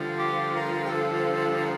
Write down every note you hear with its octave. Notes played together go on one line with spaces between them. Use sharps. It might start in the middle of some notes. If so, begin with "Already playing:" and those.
Already playing: G2 D3 F3
G4
A#4
G4
A4
A#4